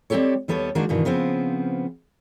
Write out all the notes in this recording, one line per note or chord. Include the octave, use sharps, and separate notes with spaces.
G3 C4 F4 G4 A4 C#5
D#2 G3 B3 A4 C#5
D#3 G#3 A#3 D4 F#4
G2 B2 D#3 E3
C#3 F3 B3 C4